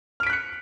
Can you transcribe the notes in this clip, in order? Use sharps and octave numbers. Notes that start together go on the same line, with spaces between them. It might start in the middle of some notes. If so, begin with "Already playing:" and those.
F6 F#6 B6 C#7 D7